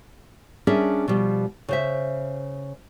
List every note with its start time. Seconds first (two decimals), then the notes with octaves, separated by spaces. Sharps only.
0.67 G3 C#4 D4 G#4 A#4 E5
1.08 B2 F3 G3
1.68 C#3 C5 E5